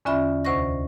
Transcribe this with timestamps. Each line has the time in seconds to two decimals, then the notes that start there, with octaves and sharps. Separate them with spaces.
0.05 E2 D3 C#4 F4 E5 B5
0.45 D2 C3 C5 D#5 C#6 A#6